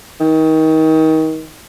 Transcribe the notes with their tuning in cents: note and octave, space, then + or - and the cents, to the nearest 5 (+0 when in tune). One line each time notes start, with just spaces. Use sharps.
D#3 +30